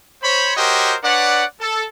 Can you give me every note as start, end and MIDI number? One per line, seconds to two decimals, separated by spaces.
0.23 0.55 72
0.23 0.55 73
0.23 0.55 83
0.57 0.95 66
0.57 0.95 67
0.57 0.95 70
0.57 0.95 72
0.57 0.95 73
0.57 0.95 75
1.04 1.43 62
1.04 1.43 71
1.04 1.43 73
1.04 1.43 74
1.04 1.43 78
1.61 1.85 69